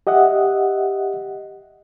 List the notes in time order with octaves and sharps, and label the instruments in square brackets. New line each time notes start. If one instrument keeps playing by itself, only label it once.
[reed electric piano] G4 D#5 E5 F#5